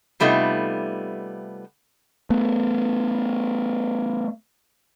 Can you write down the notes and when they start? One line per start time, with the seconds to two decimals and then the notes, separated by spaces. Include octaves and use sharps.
0.20 C3 G3 A3 B3 D#4 F4
2.30 A3 B3